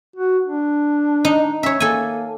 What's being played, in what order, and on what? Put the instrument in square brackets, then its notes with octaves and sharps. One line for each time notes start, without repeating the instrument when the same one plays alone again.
[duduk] F#4
D4
[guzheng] D#4
[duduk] C#4 [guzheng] C#5 E5
[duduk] A#3 [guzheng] A4 G#5